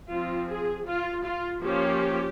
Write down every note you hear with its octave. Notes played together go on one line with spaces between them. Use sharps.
F3 C4 F4
G#4
F4
F4
F3 A#3 C#4 G4